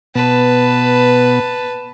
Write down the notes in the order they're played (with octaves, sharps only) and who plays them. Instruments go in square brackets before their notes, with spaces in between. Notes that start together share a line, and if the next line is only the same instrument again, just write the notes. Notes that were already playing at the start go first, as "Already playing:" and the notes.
[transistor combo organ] B2 B3 [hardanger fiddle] B4 A5